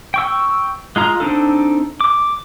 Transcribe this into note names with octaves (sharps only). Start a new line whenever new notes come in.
G5 C#6 E6
G#3 F4 A#5
C4 D4 D#4 A4
D6